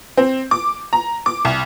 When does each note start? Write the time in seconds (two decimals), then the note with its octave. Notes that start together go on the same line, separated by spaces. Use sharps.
0.18 C4
0.51 D6
0.93 A#5
1.26 D6
1.45 C2